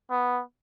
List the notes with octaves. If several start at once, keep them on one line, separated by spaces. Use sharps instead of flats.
B3